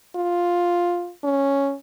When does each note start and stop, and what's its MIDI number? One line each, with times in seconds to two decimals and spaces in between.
0.15 1.12 65
1.24 1.75 61